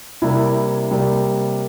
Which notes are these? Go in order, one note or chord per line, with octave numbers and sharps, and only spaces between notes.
C3 G3 A#3 E4
C3 G3 A#3